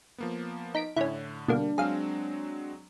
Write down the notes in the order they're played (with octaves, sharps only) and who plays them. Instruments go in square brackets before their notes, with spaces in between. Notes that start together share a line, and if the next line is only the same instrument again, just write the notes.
[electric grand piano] F3 A#3 B3
[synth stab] D#4 B6 D7
[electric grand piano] A2 D3 [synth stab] C#4 E4
[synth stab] B2 D3 A#3 [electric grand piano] G3 [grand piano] D4
[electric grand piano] F#3 G#3 C4 [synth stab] G#4 F5